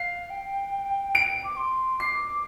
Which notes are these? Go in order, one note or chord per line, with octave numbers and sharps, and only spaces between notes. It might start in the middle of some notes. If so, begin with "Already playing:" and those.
Already playing: F5 C7
G5
D7
D6
C6
D6 C7